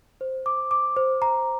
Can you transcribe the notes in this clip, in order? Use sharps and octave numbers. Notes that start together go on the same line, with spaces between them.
C5
D6
D6
C5
A#5